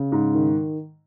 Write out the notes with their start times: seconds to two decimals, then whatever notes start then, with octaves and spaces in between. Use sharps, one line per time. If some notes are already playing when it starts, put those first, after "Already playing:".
Already playing: C#3
0.12 G#2
0.34 D#3